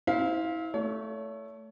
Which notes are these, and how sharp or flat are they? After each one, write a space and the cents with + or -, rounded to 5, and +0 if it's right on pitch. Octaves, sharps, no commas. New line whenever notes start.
E4 -30 C5 +0 F5 +0
A3 +0 C#5 +35